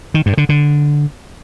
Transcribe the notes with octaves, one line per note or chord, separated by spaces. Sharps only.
D#3
G2
D3
D3